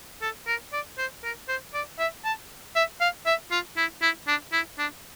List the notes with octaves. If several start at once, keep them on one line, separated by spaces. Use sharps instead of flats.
A4
A#4
D5
C5
A#4
C5
D5
E5
A5
E5
F5
E5
F4
E4
E4
D4
E4
D4